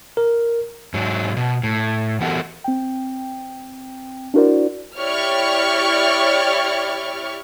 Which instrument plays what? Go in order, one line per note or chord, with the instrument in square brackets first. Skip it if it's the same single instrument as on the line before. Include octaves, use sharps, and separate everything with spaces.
[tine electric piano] A#4
[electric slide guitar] G#2 F#3
B2
A2
E3 B3 F#4 G4 A4 A#4
[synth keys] C4 G5
D4 E4 F#4 A#4 C5 D5
[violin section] E4 G4 C#5 D5 C#6 F6